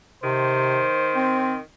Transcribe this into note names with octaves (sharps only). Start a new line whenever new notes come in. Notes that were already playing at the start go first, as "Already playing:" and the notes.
C3 D#3 C5
C4